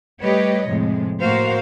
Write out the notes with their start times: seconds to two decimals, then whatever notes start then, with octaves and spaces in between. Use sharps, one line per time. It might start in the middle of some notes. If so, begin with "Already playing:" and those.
0.21 G3 A3 G4 B4 C#5 D#5
0.67 F2 A2 C3 G#3
1.20 A2 A#3 F#4 A#4 C5 F5